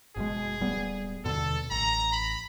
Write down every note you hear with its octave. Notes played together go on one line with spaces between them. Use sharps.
F#1 B2 G#3 G#4
D1 G3 B3
D#2 B2 D3 A4
A1 A#5
B5